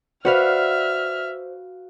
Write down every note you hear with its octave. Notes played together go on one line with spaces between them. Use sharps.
F#4 B4 C5 D5 E5 F5 F6